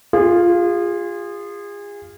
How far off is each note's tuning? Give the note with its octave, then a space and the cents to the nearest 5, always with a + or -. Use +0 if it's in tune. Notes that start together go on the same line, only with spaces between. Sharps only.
F4 +0 G#4 -30